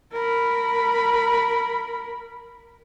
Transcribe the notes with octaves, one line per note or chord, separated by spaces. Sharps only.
A#4 B5